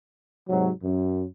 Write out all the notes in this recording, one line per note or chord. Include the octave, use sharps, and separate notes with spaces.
G#2 C3 F#3
F#2